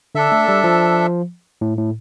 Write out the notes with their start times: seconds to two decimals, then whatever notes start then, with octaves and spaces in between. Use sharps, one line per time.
0.15 D3 D4 A4 E5
0.32 A3
0.48 G3
0.64 F3
1.61 A2
1.78 A2